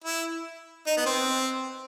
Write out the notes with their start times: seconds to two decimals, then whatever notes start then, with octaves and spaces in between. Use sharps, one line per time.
0.04 E4
0.86 D#4
0.97 B3
1.06 C4